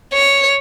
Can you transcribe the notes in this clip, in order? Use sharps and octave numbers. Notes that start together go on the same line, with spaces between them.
C#5